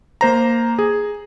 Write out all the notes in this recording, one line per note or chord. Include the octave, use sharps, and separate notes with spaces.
A#3 C5 A#5
G#4